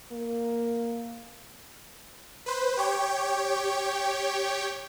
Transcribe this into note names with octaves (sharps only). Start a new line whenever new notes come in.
A#3
B4 C5
G4 C#5 G5